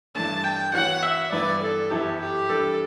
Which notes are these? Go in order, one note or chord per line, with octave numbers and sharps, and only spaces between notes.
G2 E3 A3 D4 A5
G5
E3 B3 F#4 C#5 F#5
E5
G2 E3 B3 E4 B4 D5
A4
F#2 E3 B3 E4 G4 A4
G4
E3 G3 D4 A4